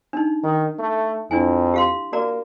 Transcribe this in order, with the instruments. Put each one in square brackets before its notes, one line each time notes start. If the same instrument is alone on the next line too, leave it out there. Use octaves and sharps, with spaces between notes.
[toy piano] D4 D#4
[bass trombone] D#3
A3
[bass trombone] F2 [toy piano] D4 E4 G#5
[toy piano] G4 F5 C6
[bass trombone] A#3 [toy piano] F#4 D5 A#5